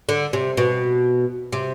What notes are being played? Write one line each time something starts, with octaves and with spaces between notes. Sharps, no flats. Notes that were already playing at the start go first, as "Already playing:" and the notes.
D3
C3
B2
C3